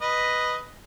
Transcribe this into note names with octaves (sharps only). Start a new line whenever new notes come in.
B4 D#5